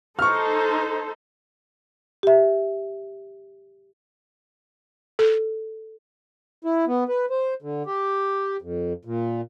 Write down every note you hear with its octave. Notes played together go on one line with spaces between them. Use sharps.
D#4 A4 C5 C#6 F6
G4 E5
A4
E4
B3
B4
C5
D3
G4
F2
A#2